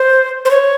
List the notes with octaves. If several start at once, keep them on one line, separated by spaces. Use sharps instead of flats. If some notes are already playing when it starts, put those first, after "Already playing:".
Already playing: C5
C5
C#5